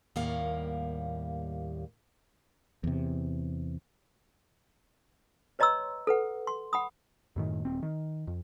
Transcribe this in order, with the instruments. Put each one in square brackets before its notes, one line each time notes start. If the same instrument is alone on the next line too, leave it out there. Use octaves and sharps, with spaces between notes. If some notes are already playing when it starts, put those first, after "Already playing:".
[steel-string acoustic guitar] D#2 A2 G3 A#3 F5 F#5
[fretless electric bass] E2 C3
[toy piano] B4 C#5 D#5 A#5 C6 E6
A4 B4 F#5
C6
F#5 B5 D#6
[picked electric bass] F#2 A2 D#3
D#1 C4
D#3
F2